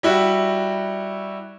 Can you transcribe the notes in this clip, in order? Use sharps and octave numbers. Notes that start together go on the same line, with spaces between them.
G3 E4 F#4